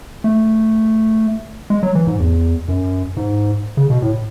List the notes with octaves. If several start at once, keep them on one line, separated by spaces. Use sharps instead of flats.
A3
G#3
F#3
E3
G#2
E2
F#2
G#2
C#3
B2
A2